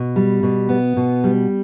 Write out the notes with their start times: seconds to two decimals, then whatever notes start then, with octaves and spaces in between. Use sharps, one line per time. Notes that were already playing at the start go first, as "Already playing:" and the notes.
Already playing: B2
0.16 G3
0.43 B2
0.69 B3
0.97 B2
1.24 G3